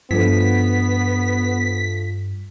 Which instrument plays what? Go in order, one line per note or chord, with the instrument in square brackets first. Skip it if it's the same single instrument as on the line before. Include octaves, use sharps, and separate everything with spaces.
[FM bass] G2 [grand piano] F3 A3 D4 [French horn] B3 [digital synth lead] B6